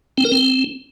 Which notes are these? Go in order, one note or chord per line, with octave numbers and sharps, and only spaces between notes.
C4
A#4
C4